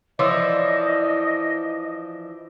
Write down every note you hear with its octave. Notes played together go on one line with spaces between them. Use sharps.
E3 F3 D4 C#5 D#5 C6 E6